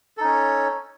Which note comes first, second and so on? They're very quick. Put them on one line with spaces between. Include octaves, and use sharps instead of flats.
A4 D#4 C#4 C#5